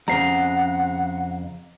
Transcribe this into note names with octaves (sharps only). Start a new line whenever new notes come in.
F2 C#3 F#5 A#5 C7